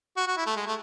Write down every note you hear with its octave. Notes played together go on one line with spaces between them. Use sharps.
F#4
F#4
E4
A3
G#3
A3